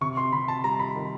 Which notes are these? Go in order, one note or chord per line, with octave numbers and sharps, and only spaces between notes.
C3 C#6
C6
C3 B5
A5
G3 A#5
B5
D#3